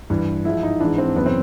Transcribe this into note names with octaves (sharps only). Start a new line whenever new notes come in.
G2 E3
G#2 F3 E4
D#4
G#2 E3 D4
C4
F#2 C#3 E3 B3
C4